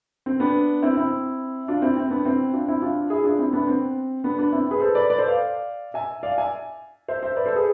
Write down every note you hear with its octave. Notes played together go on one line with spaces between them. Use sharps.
C4
B3 D4
C4 E4
C4 E4
D4 F4
C4 E4
C4
B3 D4
C4 E4
D4 F4
C4 E4
D4 F4
E4 G#4
D4 F4
C4 E4
B3 D4
C4
B3 D4
B3 D4
C4 E4
G#4 B4
A4 C5
B4 D5
B4 D5
A4 C5
D5 F5
E5 G#5
D5 F5
E5 G#5
C5 E5
C5 E5
B4 D5
A4 C5
G#4 B4